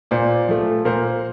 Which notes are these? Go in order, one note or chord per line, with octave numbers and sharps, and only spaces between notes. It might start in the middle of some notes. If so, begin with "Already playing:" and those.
A#2 C5 D5
F3 A3
A#2 A#4 C5